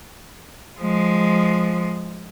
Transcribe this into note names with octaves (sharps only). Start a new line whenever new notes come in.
F3 G#3